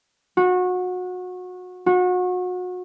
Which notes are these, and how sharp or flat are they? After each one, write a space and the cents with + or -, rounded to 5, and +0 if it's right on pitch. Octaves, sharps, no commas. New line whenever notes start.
F#4 -25
F#4 -30